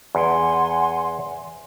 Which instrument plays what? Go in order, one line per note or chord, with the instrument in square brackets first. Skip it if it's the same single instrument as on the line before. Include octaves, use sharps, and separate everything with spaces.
[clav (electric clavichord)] E2 [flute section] F#5 G#5 C6